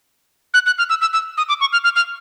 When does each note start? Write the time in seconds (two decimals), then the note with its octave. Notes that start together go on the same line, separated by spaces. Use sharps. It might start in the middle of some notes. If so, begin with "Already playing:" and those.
0.54 F#6
0.66 F#6
0.78 F6
0.90 E6
1.01 E6
1.13 E6
1.37 D#6
1.49 D6
1.61 C#6
1.73 F6
1.84 F6
1.96 F6